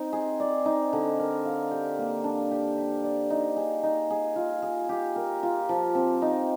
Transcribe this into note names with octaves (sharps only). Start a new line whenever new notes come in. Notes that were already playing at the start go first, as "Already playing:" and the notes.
Already playing: C4 D#4
G#4
D5
D#4
D3
A#4
F5
G4
A#3
D4
G4
G4
D5
D#4
G#4
D#4
G#4
F4
G#4
G4
A#4
F4
F3
C4
D#4